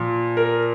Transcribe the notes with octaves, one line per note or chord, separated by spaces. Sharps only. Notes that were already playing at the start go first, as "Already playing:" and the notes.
Already playing: A#2 F3
A#4